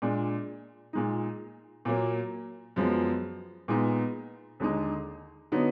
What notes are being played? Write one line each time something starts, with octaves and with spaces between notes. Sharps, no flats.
A#2 G#3 D4
A#2 G#3 D#4
A#2 F#3 A#3
F#2 F3 G#3 B3
A#2 G#3 B3 D#4
D#2 D3 G#3 D#4
D3 F#3 B3 D#4